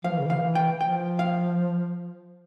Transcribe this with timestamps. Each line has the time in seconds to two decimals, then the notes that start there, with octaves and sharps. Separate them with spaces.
0.04 F3 F5
0.12 E3
0.20 C#3
0.27 E3 F5
0.42 E3
0.55 G5
0.81 F3 G5
1.19 F5